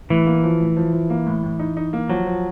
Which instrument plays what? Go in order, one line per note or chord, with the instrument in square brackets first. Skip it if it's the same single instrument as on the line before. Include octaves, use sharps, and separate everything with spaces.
[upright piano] A2 [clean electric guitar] E3
[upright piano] A#3
F3
A2
F3
F3
A#3
A2
A2
D#4
D#4
A#3
[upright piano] F3 [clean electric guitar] F#3
[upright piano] F3